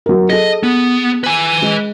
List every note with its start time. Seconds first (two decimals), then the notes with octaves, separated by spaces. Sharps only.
0.06 F#3 A#4
0.30 G#4 A4 D#5
0.63 B3
1.24 B4 G#5
1.62 G#3